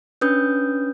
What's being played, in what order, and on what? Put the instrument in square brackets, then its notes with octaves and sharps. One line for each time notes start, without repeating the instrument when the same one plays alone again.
[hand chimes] C#4 D4 B4 D#6 G6